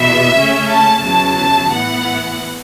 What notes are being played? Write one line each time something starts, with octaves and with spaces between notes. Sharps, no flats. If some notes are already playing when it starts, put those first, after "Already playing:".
Already playing: E2 B2 B3 E5
C#3 A3 C#4
A5
E2 C#3 F#3 A5
A2 E3 B3 F#5